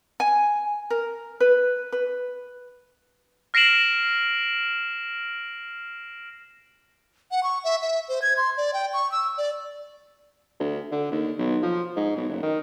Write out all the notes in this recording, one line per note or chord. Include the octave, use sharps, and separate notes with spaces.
G#5
A#4
B4
B4
F6 A#6 C7 D7 E7 F#7
F#5
C#6
E5
E5
C5
G#6
C6
D5
G5
C#6
E6
D5
D2
D3
D#2
B1
F3
G#2
B1
F#1
D#3